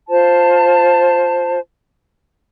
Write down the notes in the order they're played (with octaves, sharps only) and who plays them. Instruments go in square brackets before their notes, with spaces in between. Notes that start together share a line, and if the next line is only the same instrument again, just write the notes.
[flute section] F4 C5 A5